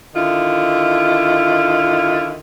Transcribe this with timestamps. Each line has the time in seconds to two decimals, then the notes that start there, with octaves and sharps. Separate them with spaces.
0.15 D3 D#3 E4 F4